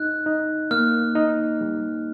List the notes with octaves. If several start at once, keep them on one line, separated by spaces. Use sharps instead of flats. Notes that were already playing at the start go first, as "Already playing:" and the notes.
Already playing: D#4 F#6
D#4
A#3 F6
D#4
G3